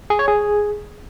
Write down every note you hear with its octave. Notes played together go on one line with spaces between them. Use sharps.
G#4
C#5
G#4